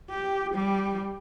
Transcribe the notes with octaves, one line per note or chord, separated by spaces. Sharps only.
G4
G3